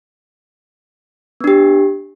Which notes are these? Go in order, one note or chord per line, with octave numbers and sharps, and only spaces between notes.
B3 D4 G4